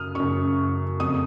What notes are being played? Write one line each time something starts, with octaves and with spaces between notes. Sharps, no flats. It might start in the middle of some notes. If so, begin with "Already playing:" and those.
Already playing: F#2 C#3 D#6 F6
F#2 C#3 C#6
F2 C#3 D#6